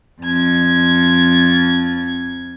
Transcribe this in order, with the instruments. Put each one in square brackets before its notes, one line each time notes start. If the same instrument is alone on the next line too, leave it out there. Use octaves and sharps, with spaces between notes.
[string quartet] F2 G#6